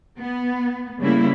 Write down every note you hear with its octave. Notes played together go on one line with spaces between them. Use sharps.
B3
C#3 G3 A#3 E4